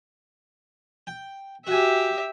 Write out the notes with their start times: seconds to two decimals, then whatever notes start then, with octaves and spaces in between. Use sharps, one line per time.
1.07 G5
1.67 F#4 G4 E5 G#5